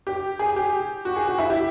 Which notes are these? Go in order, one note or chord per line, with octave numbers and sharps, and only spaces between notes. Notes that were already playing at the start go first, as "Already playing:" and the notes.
G4
G#4
G4
F#4
G#4
F#4
E4
G4